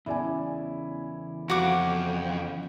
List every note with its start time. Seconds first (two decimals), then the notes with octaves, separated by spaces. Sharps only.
0.06 E2 C#3 E4 D5 G#5
1.50 F2 F#4 D6